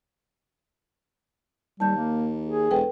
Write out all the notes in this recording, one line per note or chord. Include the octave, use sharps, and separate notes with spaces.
D#2 G3 A5 G6
A#3
G#4
E1 A4 B4 G5